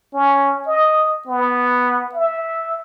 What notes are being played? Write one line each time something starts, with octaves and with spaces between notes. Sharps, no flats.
C#4
D#5
B3
E5